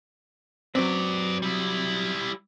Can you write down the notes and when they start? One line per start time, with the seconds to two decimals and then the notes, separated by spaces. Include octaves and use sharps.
0.75 F#3 C4 B4 D5
1.42 G3 E4